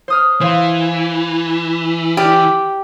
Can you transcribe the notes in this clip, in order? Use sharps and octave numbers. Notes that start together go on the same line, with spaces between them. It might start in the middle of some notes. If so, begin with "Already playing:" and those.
C5 D#6 F6
E3 C5 F5 C6
G4 D5 F6